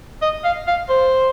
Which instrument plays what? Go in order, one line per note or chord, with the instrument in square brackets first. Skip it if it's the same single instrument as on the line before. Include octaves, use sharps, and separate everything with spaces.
[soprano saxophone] D#5
F5
F5
C5